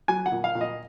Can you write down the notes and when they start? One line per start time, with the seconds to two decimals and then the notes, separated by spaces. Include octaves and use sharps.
0.08 F#3 G#5
0.26 F#5
0.32 A#2
0.44 F5
0.55 A#2
0.61 D#5